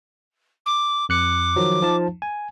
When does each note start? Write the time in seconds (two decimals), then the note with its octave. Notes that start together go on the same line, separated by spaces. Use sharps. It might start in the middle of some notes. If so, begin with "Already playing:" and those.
0.66 D6
1.09 F2 D6 F#6 C#7
1.56 D#3 F3 F#3
1.82 F3 D#4 A5
2.22 G#5